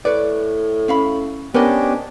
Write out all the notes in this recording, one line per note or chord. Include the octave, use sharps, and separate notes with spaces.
A2 B4 C#5 D5
C#4 F5 B5
B3 C#4 D4 G4 A#4 C5 D#5